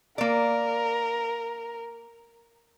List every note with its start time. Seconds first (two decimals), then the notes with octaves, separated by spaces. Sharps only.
0.18 A#3 A#4 D5